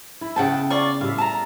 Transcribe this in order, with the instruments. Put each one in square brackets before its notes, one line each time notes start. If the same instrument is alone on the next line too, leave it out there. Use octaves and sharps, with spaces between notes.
[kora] E4
[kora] C#3 B3 [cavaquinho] F#5 G5 A5
[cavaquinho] F4 D5 C#6
[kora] A2 G3 E5 [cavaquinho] F5
[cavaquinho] A5 A#5